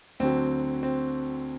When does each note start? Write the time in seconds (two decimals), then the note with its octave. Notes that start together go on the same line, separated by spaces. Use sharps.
0.20 D2 D3 F#3 C4
0.83 C4